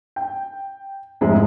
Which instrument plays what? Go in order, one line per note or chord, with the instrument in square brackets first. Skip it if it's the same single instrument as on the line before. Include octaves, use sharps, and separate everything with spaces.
[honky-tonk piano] G5
F1 G#2 G#3 E4